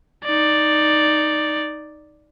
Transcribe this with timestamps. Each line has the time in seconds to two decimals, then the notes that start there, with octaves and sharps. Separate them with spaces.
0.25 D#4 D5